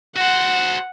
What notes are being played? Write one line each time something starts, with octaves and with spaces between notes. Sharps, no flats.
F#4 C5 F#5